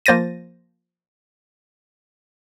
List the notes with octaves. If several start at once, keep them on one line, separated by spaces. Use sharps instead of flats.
F3 A#3 C5 A6 A#6 D#7